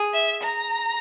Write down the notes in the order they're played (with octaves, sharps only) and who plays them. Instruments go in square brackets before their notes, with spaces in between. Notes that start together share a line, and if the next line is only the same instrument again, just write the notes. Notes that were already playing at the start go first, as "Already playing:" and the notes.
Already playing: [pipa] G#4
[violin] E5
A#5